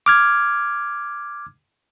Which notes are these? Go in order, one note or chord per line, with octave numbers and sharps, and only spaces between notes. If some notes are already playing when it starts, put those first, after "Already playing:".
D6 F6 G#6